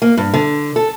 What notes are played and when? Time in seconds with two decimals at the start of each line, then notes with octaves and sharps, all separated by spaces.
0.02 A#3
0.17 G2
0.34 D3
0.76 A4